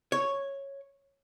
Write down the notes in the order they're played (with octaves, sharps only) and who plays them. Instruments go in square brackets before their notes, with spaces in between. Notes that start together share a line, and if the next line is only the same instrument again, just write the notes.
[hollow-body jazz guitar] C#5